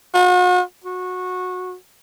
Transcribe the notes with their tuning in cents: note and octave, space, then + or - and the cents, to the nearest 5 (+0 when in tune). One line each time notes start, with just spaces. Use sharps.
F#4 -45
F#4 -20